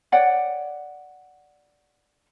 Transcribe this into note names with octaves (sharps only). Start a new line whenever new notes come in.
C#5 D5 F#5 G5